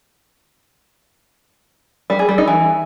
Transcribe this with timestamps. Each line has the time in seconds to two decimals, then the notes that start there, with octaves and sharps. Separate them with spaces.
2.10 G3
2.19 G#4
2.29 G3
2.38 D#4
2.47 E3